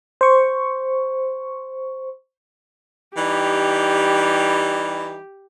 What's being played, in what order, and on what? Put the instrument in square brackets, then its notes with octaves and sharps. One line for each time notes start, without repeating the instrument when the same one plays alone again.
[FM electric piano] C5 C#6
[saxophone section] E3 G3 D#4 [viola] G4